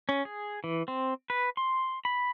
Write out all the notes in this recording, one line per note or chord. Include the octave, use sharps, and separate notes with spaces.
C#4
G#4
E3
C4
B4
C6
B5